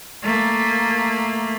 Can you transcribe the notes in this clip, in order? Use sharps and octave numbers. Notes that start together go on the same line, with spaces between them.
A3 A#3